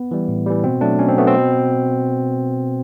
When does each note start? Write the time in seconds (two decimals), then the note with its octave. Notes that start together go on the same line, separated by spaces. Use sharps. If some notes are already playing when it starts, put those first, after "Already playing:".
Already playing: B3
0.11 E3 G3
0.28 A2
0.46 E3 G3
0.64 B2 C4
0.81 F#3 A3 D4
0.99 B2 C#4
1.08 C4
1.17 F#3 A3 B3
1.28 C4
1.34 B2